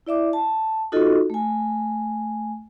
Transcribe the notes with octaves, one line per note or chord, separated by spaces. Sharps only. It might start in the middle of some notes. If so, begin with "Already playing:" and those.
E4 D5 E5 D6
A5
D#4 F4 F#4 A4 D#5
A3 G#5